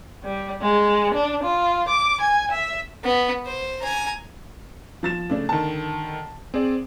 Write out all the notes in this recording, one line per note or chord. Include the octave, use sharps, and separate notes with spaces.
G3
G#3
D4
F4
D6
G#5
E5
B3
C5
G#5 A#5
F3 A6 E7
C#3 A3 D4
D3 D#3 A5
C4 G#4 D5